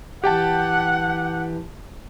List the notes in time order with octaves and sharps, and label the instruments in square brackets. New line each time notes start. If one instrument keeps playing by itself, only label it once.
[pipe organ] E3 [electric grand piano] G4 G5 A5 [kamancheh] F#5